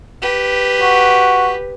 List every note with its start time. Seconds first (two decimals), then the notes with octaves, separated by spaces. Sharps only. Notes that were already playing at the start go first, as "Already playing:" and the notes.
0.22 G4 B4
0.81 F#4